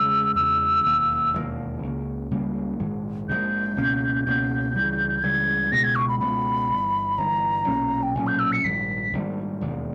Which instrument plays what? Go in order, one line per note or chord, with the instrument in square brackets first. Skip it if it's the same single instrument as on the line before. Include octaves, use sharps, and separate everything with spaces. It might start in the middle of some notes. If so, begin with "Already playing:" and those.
Already playing: [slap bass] E2 C#3 G#3 [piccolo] E6
[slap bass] E2 C#3 G#3 [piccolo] E6
[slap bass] E1 D#2 D#3 A#3
E1 D#2 D#3 A#3
C#2 C#3 G3 A#3
C#2 C#3 G3 A#3
A#1 G#2 D#3 G#3
[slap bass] A#1 G#2 D#3 G#3 [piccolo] G6
[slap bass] C#2 B2 A#3 C#4
[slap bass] C#2 B2 A#3 C#4 [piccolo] G6
[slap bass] C#2 C#3 E3 G3
[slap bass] C#2 C#3 E3 G3 [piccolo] G#6
[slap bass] C#2 B2 G#3 B3 [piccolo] A#6
[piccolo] G#6
C#6
B5
[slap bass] C#2 B2 G#3 B3 [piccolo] B5
[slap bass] G1 G2 E3
[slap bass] G1 G2 E3 [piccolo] A#5
[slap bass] B1 A#2 A#3 C#4
[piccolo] G5
[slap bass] B1 A#2 A#3 C#4 [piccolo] G#5
[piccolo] G6
E6
C#7
[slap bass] A#1 G#2 D#3 G3 [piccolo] B6
[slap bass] A#1 G#2 D#3 G3
E1 D#2 D#3